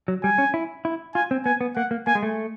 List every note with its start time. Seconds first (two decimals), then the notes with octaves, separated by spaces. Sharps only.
0.08 F#3
0.24 G3 G#5
0.38 C#4
0.54 E4
0.85 E4
1.15 F4 G#5
1.31 C4
1.46 B3 G#5
1.61 B3
1.76 A#3 F#5
1.91 A#3
2.07 A#3 G#5
2.15 G#3
2.23 A3